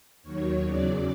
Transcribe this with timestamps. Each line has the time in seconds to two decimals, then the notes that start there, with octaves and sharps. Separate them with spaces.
0.23 D#2 D#3 F#3 C#5
0.64 E2 C#3 F#3 D5